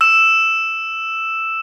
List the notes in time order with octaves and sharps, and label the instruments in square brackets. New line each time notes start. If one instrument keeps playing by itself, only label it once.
[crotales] E6 E7